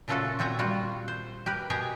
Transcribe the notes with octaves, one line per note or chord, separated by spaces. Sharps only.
A#2 C#3 A3 F4 F#4 A4
A#2 C4 F4 F#4 G#5 A#5
G3 F4 F#4
C5
G4 A#4 B4
B2 G4 G#4 G#5 A#5